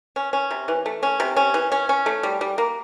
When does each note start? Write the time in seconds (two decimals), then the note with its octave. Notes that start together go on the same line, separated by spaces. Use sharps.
0.16 C#4
0.33 C#4
0.51 C3
0.68 E3
0.86 A3
1.03 C#4
1.20 C3
1.37 C#4
1.54 E3
1.72 C#4
1.89 C#4
2.06 A3
2.23 G3
2.41 G3
2.58 A#3